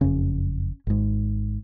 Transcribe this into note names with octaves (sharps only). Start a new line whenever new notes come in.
F#1 F2 C#3 C#4
G#1 G#2